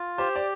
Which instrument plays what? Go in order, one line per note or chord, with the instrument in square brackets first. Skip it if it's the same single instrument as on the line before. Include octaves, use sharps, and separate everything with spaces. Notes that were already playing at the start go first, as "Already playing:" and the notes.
Already playing: [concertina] F4
[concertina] G4 [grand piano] C5
[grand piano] D5